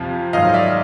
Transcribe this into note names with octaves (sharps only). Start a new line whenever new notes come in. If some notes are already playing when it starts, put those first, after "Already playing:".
Already playing: F2 C3 F3
G#2 D#3 F#3 D#5 F5
D5 E5